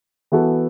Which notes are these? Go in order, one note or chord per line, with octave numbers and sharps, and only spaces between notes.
E3 B3 F#4 A4